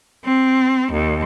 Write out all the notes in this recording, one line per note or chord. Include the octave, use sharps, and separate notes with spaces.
C4
D#2